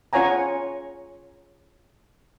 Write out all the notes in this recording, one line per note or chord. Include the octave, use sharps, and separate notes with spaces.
C#4 F4 C#5 F#5 G#5 A#5